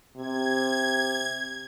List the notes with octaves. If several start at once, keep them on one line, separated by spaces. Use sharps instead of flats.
C3 G#6